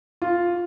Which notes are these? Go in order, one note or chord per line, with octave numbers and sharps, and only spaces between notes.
F4